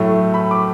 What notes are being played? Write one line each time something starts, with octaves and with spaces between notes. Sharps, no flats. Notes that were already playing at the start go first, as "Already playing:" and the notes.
Already playing: A2 F#3 A3
B5
D6